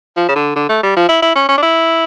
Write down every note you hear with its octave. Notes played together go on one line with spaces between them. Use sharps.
F3
C#3
D3
D3
A3
G3
F3
E4
E4
C#4
C#4
D4
E4